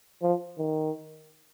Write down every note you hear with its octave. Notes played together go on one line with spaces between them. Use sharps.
F3
D#3